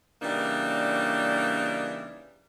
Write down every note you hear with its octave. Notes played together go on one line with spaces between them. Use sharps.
C#3 E3 G3 A#3 D4 D#4